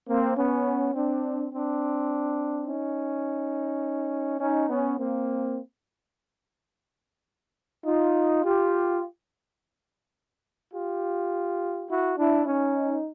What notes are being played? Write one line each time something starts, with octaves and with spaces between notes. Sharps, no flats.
A#3 C4
B3 C#4
C4 D4
C4 D4
C#4 D#4
C#4 D#4
B3 C#4
A#3 C4
D#4 F4
F4 G4
F4 G4
E4 F#4
D4 E4
C#4 D#4